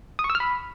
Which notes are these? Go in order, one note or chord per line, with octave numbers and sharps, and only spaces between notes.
D#6
C#6
E6
F6
B5